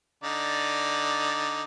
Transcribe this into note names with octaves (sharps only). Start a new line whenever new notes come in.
D3 D#4 D5